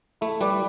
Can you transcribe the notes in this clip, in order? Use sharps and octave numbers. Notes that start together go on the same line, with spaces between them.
A3 E4
G3 B4 D5